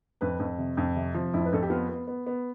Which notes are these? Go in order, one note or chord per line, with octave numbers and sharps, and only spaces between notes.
F2 B4
F2
C3
F2
C3
F3
F2 E4
B4
F2 A4
G4
B3 F4
B3
B3
B3